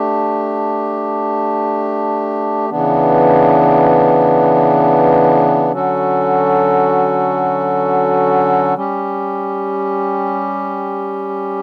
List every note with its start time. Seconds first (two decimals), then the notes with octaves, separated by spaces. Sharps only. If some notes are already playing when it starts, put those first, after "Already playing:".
Already playing: A3 D4 G4
2.70 C#3 E3 B3 D4
5.72 D3 F#3 C#4 F#4 A4
8.75 G3 C#4 G4